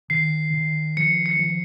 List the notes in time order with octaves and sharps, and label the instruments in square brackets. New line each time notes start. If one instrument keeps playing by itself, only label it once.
[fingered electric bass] D#3 [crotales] C7
[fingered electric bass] D#3
[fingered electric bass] F3 [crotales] C#7
[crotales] C#7
[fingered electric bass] F3